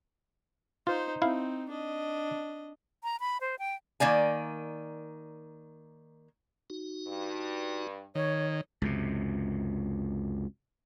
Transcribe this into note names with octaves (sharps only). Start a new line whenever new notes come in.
D#4 F4 C5
C4 D#4 E4 F5
D4 D#5
A#5
B5
C5
G5
D#3 A#3 D5 G#5
D#4 F#4
G2
D#3 C#5
C#2 F#2 C3